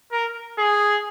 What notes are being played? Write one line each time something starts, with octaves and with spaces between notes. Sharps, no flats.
A#4
G#4